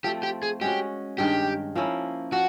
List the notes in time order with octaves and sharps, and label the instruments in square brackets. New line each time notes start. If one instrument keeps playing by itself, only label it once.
[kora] F3 A3 C4 [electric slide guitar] G4
[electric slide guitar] G4
G#4
[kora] G#3 C#4 F#4 [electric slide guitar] G4
[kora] G2 D#3 G#3 [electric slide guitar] G4
[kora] F3 A#3 C#4 E4
[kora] F3 [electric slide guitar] F#4